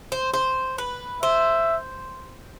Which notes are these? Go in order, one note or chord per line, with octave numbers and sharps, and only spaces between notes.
C5
C5
B4
C5 E5